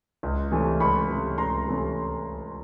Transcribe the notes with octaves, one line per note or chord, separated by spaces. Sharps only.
C#2
C3 E3 A3 C#4
C#2 B5 C#6
C3 E3 A3 C#4
C#2 A#5 C6
C3 E3 A3 C#4